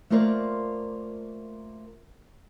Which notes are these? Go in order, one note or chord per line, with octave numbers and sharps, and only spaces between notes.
A3 A#3 F4 A#4 C5 D5